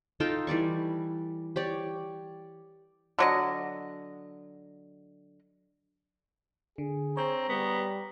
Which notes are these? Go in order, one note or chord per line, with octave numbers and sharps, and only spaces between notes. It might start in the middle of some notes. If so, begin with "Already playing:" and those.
D#4 F4 A4 G5
E3 G3 D5 C#6
G4 C#5 D5
D3 F#3 D#5
D3 G#4
C4 C#5 A#5
G3 B3